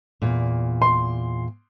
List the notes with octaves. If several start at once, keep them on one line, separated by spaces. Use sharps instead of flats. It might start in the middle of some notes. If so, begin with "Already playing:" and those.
E2 A#2
C6